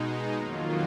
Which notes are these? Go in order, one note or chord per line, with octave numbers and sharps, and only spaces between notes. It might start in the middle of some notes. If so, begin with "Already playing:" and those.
Already playing: B2 G#3 D#4
F2 D#3 F#3 A#3 F4